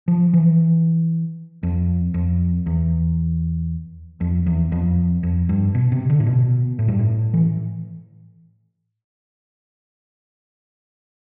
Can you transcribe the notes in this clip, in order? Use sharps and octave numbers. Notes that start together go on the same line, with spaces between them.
F3
E3
F2
F2
E2
F2
E2
F2
F2
G2
B2
C3
D3
A2
B2
A2
G2
A2
E3